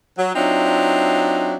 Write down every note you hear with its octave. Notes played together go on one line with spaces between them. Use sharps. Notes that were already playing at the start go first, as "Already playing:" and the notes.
F#3
F#3 C4 D4 D#4 F4 E5